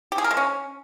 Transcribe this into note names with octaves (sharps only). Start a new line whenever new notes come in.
G4
G#4
A#4
G#3
C#4